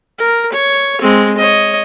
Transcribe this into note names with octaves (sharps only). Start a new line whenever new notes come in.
A#4
C#5
G#3 C4
C#5 D#5